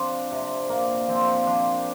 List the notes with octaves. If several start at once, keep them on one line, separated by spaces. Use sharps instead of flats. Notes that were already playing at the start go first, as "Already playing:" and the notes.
Already playing: F3 C4 D4
C3
A#2 A#3
F3 C4
F3 D4